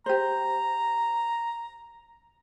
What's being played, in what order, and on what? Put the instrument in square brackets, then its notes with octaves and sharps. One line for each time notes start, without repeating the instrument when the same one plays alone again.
[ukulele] G4 C5 [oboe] A#5